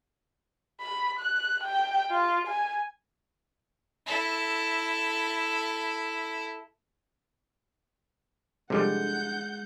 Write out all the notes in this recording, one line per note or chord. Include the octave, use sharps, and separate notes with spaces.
B5
F#6
G5
F4
G#5
E4 A4
C3 F3 G3 G#3 D4 A4 F#5 G6